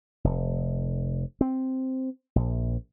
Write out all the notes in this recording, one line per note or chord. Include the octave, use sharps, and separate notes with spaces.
F1
C4
A#1